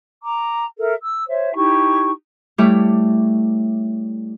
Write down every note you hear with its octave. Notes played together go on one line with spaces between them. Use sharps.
A#5 D6
A4 A#4 E5
E6
C5 C#5 E5
D#4 E4 G4 C#6
G3 A3 E4 C#5 D6